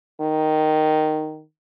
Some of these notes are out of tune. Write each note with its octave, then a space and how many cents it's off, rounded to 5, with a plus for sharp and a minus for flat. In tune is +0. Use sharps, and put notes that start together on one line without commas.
D#3 -5